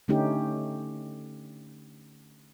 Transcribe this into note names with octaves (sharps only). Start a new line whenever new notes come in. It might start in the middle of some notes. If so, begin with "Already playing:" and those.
D3 A3 C#4 D#4 G4